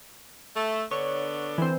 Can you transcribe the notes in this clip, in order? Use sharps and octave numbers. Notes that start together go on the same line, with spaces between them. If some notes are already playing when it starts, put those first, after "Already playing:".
A3
D3 B3 D4 C#5
E3 C4